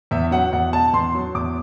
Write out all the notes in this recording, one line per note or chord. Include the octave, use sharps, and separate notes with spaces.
E2 E5
F#3 F#5
E2 F#5
B2 A5
E2 C6
F#3
E2 D6